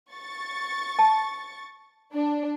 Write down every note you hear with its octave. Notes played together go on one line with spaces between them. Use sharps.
C#6 A6
A5
D4